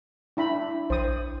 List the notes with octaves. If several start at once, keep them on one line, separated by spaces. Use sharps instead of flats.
D4 E4 B5
A#1 C5 D#6